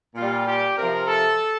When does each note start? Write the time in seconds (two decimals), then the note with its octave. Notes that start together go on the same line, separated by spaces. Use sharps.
0.15 A#2 G3 F4
0.46 G4
0.77 C3 F3 A#4
1.07 A4